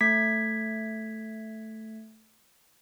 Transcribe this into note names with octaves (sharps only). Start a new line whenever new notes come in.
A3 G#6 B6